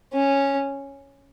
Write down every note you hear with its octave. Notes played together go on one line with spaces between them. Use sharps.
C#4